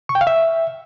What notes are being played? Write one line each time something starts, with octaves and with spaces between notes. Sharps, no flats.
C#6
G5
F5
E5